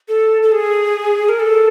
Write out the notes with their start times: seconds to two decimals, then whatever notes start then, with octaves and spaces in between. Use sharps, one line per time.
0.08 A4
0.42 A4
0.52 G#4
1.29 A#4
1.40 A4